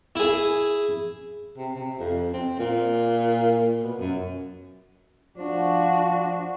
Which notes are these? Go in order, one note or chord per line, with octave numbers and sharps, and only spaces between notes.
E4 G#4
C3
C3
F2
C4
A#2
B2
F#2
F3 D4 F#4